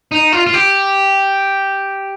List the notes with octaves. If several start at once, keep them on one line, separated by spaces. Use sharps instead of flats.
D#4
F4
F4
G4